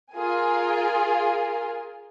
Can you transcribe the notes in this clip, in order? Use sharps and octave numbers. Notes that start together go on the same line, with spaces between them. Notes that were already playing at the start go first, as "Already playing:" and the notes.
F4 G#4 A#4 G#5